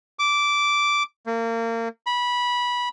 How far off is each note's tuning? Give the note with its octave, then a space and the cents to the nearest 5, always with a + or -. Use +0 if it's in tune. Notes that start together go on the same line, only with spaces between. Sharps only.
D6 -10
A#3 -30
B5 -15